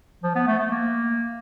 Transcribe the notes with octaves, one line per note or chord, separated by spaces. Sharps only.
F3
B3
A3
A3
A#3